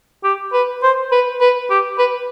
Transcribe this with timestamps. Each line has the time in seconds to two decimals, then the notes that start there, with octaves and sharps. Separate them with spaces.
0.24 G4
0.53 B4
0.83 C5
1.12 B4
1.41 B4
1.70 G4
1.98 B4